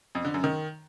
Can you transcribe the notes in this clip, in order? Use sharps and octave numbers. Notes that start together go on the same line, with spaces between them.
F2
D3
F#2
D#3